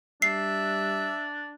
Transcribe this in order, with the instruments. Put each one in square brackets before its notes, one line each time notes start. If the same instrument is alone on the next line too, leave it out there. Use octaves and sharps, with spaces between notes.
[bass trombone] G3 [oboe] D4 [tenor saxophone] E5 [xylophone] C7